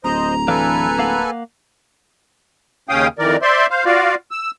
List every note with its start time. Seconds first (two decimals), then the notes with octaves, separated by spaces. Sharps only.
0.04 D1 C5 D#5 A#5
0.48 E3 D4 A4 B4 F5 G#5
0.99 A#3 F5 F#5
2.89 D#2 C#3 C#4 F5 G5 D#6
3.19 F2 D#3 E3 A#4 D5
3.42 C5 D5 E5 C6
3.71 C5 F5
3.85 F4 F#4 D5 F5
4.31 E6